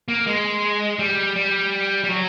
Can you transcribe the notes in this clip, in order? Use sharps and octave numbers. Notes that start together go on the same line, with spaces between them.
A#3
G#3
G3
G3
G3
F#3